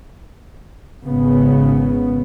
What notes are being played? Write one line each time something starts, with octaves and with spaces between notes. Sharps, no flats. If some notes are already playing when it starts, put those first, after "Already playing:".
G#1 C#3 B3